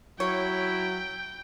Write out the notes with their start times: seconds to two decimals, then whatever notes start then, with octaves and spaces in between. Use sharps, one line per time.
0.20 F#3 E4 C#5 G5